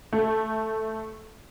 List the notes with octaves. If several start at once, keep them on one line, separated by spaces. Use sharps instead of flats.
A3